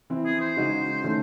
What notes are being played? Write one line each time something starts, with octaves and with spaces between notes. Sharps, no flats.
E3 C4 E4
G#4
C5
C#3 G#3 D#4 F#4
D#3 A3 C#4